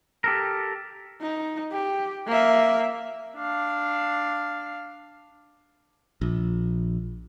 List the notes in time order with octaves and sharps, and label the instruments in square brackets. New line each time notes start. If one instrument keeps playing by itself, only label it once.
[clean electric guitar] G4 A4 A#4
[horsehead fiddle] D#4
G4
A#3 E5
[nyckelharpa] D4 F5
[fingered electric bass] A#1